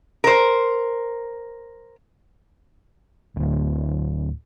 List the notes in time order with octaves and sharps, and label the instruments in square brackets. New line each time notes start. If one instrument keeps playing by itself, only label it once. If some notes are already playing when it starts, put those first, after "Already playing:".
[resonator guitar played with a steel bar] A#4 C5
[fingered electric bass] D1